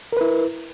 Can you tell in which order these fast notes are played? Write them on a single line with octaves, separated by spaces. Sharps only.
A#4 B4 E4